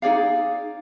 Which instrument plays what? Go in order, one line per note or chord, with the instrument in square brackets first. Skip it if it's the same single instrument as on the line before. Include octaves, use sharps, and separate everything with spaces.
[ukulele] D#4 G#4 D5 F5